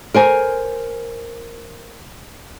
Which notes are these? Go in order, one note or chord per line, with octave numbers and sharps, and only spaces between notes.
A#4 C5 G#5